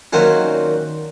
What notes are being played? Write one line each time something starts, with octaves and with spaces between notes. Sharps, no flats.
A#2 D#3 F#3 C4 C#4